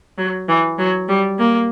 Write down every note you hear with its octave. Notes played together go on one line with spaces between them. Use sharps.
F#3
E3
F#3
G3
A#3